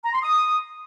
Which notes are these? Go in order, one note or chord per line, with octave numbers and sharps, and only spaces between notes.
A#5
C6
D#6